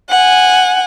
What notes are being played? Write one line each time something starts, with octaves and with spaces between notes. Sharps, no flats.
F#5 G#5